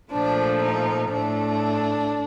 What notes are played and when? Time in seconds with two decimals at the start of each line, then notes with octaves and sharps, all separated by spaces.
0.11 A#2 F3 A3 D4
0.61 D#4
1.12 A2 A3 D4